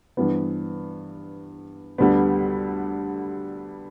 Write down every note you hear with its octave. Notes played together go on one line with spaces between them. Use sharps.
G2 E3 B3
D2 D3 G3 B3